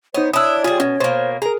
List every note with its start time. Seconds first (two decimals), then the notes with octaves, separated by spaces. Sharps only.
0.14 B3 D#4 C5 C#5
0.33 D4 E4 C#5 D#6 E6
0.64 G3 F4 G#4
0.80 B2 C#4
1.00 B2 A#3 C5
1.42 G#4 A#4 A#5